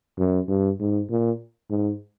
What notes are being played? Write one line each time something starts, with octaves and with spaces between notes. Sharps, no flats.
F#2
G2
G#2
A#2
G#2